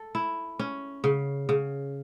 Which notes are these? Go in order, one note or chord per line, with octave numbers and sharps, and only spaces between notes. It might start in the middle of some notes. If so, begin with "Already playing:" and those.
Already playing: A4
E4
C#4
C#3
C#3